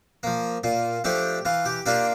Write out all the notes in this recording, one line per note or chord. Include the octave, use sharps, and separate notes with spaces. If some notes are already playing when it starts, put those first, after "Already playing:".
F3 A#3
A#2 F4
F3 A3 D4 G4
E3 F4
G4
A#3 D4 F4 G4